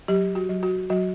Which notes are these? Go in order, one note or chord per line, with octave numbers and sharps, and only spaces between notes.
F#3 G4
F#4
F#3
F#4
F#3 F#4